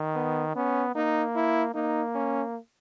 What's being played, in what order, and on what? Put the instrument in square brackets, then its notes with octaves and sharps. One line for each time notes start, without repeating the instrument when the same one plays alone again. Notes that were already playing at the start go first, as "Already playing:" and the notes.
Already playing: [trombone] D#3
[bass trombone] B3
[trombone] B3 [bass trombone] C#4
[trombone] A#3 [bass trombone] D#4
[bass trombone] E4
[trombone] A#3 [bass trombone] D#4
[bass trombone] C#4